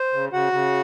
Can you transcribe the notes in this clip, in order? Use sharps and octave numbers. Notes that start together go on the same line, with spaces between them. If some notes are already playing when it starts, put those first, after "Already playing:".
Already playing: C5
C#3
C#3 F#4 F#5
C#3